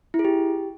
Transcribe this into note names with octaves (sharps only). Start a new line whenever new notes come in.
E4
G#4
G4